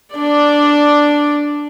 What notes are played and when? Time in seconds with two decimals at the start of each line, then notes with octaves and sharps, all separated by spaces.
0.15 D4 D5